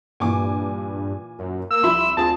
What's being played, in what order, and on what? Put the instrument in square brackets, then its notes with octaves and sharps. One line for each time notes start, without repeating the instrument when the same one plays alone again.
[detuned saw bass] G2 [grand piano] A#2 E3 [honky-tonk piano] G#5 C#6 D6
[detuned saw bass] F#2
[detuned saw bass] A#3 [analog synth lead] E6
[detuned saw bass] C2 [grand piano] F3 E4 [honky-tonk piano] E5 B5 C6
[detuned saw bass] D2 [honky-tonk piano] C4 G#4 D#6 [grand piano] F4 [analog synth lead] A5